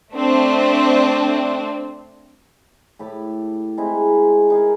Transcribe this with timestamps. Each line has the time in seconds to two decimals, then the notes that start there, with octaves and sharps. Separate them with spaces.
0.15 A3 C4 D4
2.99 A2 G4 B5 D6
3.78 G#3 C4 D#4 E4
4.50 D#4 G#4 A#4